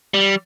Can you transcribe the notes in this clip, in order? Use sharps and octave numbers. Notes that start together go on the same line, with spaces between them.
G3